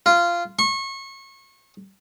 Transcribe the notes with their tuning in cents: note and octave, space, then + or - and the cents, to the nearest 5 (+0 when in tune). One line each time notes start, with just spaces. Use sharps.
F4 -15
C#6 -30